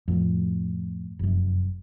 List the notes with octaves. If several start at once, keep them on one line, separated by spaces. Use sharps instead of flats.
F2 A2
F1 F#2